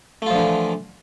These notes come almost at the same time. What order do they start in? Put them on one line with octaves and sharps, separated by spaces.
A3 F4 F3 D3 E3